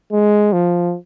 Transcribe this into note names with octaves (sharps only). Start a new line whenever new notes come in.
G#3
F3